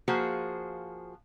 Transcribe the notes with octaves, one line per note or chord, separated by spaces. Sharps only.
F3 A#3 F#4 G#4 C5